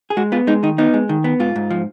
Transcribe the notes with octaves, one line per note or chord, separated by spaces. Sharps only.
G#4
G#3 F#4
B3 F4
G#3 D#4
D#3 D#4
B3 D#4
G#3
D#3
B3
G#2 F4
G#2
F3